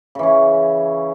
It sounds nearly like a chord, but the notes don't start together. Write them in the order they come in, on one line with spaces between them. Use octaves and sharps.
C#3 E3 C#4 E4